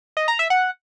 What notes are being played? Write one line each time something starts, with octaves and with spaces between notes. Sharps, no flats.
D#5
A#5
E5
F#5